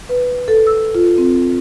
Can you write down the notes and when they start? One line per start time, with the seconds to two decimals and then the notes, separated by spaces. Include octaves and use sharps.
0.09 B4
0.48 A4
0.67 E6
0.95 F4
1.18 C4